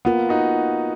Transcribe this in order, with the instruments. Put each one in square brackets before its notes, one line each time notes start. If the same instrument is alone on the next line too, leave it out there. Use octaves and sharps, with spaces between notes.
[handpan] A#3 F4 A#4 [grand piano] B3
[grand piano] D#4 F#4